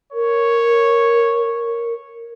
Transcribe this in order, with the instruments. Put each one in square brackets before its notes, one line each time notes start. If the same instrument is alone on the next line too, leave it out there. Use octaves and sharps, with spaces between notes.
[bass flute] A#4 [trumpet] C#5